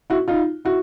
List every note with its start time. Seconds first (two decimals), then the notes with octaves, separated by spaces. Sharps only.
0.10 E4 F#4
0.28 D#4 F4
0.65 E4 F#4